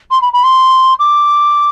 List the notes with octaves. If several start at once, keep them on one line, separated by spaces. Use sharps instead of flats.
C6
B5
B5
C6
D6